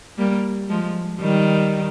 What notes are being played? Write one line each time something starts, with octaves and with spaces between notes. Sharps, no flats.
G3 A#3
F3 G#3
D#3 G3